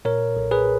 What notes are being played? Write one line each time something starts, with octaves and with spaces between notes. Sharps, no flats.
A#2 A#4 C#5
B1
G#4 B4